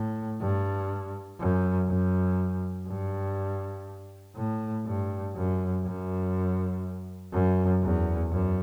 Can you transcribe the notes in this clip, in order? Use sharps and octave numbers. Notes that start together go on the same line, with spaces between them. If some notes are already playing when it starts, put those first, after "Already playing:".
Already playing: A2
G2
F#2
F#2
G2
A2
G2
F#2
F#2
F#2
E2
F#2